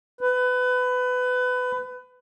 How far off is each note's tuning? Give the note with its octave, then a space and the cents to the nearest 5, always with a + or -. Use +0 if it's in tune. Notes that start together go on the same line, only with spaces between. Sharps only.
B4 +25